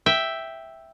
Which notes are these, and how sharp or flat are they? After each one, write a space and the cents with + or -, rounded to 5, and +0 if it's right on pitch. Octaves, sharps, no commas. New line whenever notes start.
E5 +0 G5 +0